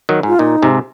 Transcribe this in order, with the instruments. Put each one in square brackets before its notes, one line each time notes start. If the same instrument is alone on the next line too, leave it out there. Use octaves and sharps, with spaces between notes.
[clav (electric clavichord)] D#3 F#3
[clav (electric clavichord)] G#2 [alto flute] F4
[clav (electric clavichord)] A#2 [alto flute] D#4
[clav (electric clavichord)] G#2 C3